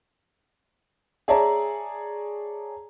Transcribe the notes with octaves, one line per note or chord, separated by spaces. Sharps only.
G#4 C#5 D5 E5 A5 A#5